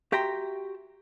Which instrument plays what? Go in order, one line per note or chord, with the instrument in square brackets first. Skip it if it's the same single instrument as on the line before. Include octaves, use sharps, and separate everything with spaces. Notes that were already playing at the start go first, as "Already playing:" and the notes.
[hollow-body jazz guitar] F#4 G4 E5 G5 A#5 C6